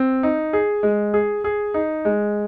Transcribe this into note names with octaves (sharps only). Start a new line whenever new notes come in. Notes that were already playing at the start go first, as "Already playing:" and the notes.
Already playing: C4
D#4
G#4
G#3
G#4
G#4
D#4
G#3